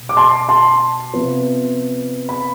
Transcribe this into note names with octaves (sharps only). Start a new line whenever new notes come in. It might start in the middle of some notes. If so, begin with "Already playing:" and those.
Already playing: B2
D6
A5 C6
A5 C6
C3 F3 B3
B5